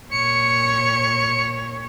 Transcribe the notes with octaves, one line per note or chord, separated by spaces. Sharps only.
A#2 C#5 C#7